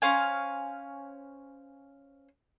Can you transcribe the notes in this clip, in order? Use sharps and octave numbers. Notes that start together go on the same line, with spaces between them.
C#4 C5 F5 G#5